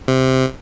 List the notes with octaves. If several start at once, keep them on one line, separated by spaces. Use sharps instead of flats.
C3